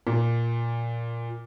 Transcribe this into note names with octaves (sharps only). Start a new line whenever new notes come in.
A#2